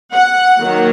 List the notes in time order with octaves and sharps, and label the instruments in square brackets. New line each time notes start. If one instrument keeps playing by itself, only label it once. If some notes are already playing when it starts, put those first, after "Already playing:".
[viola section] F#5
D#3 F#3 A#3